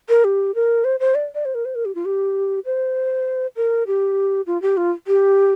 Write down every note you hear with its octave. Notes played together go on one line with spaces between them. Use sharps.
A#4
G4
A#4
C5
C5
D5
D5
C5
A#4
C5
A#4
G4
F4
G4
C5
A#4
G4
F4
G4
F4
G4